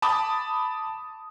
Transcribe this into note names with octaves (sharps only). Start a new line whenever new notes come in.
A5 B5 D6 D#6